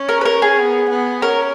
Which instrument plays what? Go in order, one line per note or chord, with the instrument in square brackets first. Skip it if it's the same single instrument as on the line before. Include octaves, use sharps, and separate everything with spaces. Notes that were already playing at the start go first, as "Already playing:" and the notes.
Already playing: [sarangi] C#4
[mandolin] A#4
B4
A#4
G#4
[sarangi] B3
B3
[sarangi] C#4 [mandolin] A#4